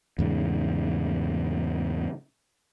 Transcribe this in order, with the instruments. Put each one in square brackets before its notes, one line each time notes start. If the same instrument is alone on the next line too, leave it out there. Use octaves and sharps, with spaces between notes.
[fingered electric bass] E2 G#2 C#3